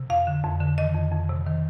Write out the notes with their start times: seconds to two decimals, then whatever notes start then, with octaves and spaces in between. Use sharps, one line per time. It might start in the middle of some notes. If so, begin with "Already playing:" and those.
Already playing: C3
0.10 F2 F5
0.27 D3
0.44 F2
0.61 D3
0.78 D#3 D#5
0.95 F2
1.12 F2
1.29 C3
1.46 D#3